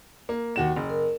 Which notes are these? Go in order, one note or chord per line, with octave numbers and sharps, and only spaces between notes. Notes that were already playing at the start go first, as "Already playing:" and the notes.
A#3
D#2 F#4 E7
F#1
A#4